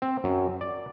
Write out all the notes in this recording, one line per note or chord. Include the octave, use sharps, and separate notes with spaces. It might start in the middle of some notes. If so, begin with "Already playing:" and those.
C4
F#2
D5